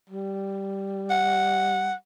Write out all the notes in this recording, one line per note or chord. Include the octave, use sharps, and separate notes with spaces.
G3
F#5